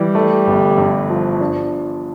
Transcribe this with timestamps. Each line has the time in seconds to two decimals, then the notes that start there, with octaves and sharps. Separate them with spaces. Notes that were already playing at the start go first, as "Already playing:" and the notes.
Already playing: E3 G3
0.15 A3
0.47 G1
0.78 G2
1.09 F3
1.41 D4